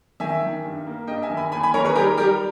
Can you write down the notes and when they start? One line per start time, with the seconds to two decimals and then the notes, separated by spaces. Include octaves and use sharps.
0.20 D#3 E5 G#5
0.43 D#3
0.64 G2
0.87 A#3
1.07 G2 D#5 G5
1.22 E5 G#5
1.30 D#3
1.37 G#5 B5
1.52 D#2 G#5 B5
1.63 G#5 B5
1.74 D#3 A#4 C#5
1.85 G#4 B4
1.95 G3 G4 A#4
2.17 G3 G4 A#4